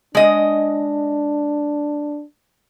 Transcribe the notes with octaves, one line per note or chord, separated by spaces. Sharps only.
G#3 D4 D#5